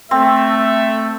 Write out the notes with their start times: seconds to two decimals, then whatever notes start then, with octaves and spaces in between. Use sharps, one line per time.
0.11 A3 C4 E5